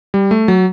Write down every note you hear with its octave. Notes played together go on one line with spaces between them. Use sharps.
G3
A3
F#3